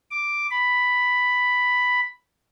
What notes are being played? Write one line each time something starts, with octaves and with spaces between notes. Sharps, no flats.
D6
B5